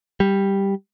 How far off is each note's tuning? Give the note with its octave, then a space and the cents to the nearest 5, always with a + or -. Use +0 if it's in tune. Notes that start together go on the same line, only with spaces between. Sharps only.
G3 +5